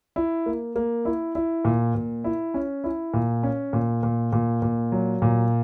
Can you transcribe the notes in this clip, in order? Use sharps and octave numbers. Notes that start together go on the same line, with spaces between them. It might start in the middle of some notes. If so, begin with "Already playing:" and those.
E4
A#3
A#3
E4
E4
A#2
A#2
E4
C#4
E4
A#2
C#4
A#2
A#2
A#2
A#2
F#3
A#2